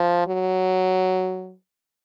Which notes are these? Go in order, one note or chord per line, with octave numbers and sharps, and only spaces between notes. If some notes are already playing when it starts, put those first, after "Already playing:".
Already playing: F3
F#3